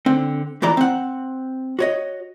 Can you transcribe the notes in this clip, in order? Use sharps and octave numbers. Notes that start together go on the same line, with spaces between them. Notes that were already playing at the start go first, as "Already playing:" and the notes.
D3 C4
F2 A#2 E3 D5 A#5
C4 F#5
F#4 C#5 D#5